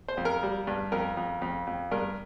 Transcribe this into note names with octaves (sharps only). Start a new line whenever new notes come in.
C5
F2
A#4
G3
G2
F2 A#4
F2
F2
F2
G2 A#4